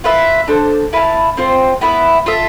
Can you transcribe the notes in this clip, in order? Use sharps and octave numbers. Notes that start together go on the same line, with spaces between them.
F4 B4 E5
D4 A4 C5
E4 B4 F5 A5
C4 F4 C5
B3 E4 B4 E5
F4 A4 E5